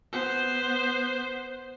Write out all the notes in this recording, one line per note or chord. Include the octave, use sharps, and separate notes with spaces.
B3 C5